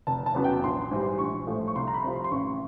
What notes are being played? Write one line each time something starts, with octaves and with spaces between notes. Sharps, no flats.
F1 A5
A5
E2 C#3 F#3 B3
G5
A#1 C6
C6
G#2 E3 G3
C6
A#1 C#6
A2 F3 A3
C#6
C2 C6
A#5
B5
C3 F3
C6
C6
A1 C#6